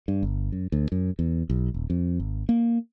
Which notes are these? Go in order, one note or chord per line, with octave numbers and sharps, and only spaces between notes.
G2
G1
F#2
D2
F#2
E2
B1
D#1
F2
G#1
A#3